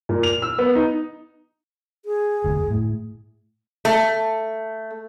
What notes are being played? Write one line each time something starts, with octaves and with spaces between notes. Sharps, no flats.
A#2
F7
E6
B3
D#4
G#4
F1 D2
A2
A3